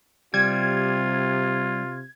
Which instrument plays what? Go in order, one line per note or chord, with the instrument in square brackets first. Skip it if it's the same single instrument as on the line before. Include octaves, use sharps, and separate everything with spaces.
[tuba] C3 [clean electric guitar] G3 [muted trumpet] F4 [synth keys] G#6